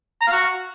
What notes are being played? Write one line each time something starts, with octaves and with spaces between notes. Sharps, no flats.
A#5
F5
F#4